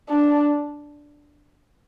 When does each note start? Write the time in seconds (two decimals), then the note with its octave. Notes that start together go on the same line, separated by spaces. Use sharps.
0.09 D4